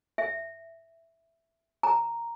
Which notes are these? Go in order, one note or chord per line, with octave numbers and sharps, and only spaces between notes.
E5
A#5